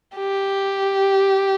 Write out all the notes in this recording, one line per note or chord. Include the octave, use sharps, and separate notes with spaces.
G4